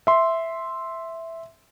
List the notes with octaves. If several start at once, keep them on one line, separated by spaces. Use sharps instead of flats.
E5 C6